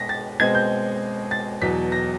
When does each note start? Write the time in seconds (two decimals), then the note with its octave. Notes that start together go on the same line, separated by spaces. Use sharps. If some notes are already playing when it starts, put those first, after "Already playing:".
Already playing: B2 G#3 A#6 B6
0.09 A6
0.39 B2 G#3 C4 G#6
0.55 G6
1.31 A6
1.62 E2 B2 F#3 B6
1.92 A#6